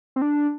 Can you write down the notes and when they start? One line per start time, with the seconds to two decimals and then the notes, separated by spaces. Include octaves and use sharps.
0.16 C4
0.22 D4